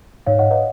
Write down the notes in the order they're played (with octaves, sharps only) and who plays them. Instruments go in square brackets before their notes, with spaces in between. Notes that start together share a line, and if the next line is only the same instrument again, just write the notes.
[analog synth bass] G#2 [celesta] C#5 F5
[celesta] D#5 F#5
B4 D#5